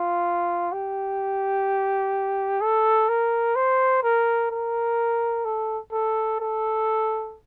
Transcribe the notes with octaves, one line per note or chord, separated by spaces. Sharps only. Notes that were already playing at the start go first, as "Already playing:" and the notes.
Already playing: F4
G4
A4
A#4
C5
A#4
A#4
A4
A4
A4